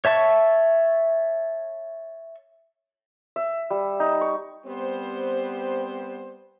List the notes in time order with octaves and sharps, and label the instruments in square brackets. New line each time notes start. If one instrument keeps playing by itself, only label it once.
[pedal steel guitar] C#5 E5 A5 C#6
[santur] E5
G3
D#4
C#6
[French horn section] G3 B3 C4 C5